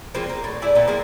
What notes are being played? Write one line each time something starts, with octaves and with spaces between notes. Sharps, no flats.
F3 G#3 A#3 C4
A#3
A2
A3 E4 G#4 D5
A#2 B3
F3 G#3 A#3 C4